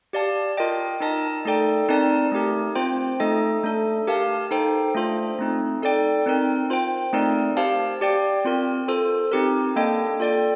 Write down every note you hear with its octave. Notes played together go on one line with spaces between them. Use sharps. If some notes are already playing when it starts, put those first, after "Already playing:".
G4 D5 F5 A5
F4 A#4 D#5 G5
D#4 A#4 D#5 A5
A3 D#4 A4 D5 G5
C4 D#4 A#4 D5 A5
A3 D#4 G4 A#4
C4 F4 C5 G5
A3 D#4 A4 D#5
A3 D4 A4
G4 A#4 F5 A5
D#4 A4 C5 G5
A3 D4 F4 C5
A3 C4 D#4
D#4 A4 D5 G5
C4 D#4 A#4
F4 C5 G5
A3 C4 D#4 A#4 D5
G4 C5 F5 A5
G4 D5 G5
C4 F4 A#4
F4 A4 C5
C4 D#4 G4 A#4
A#3 D4 A4 D#5 G5
F4 A4 D5 G5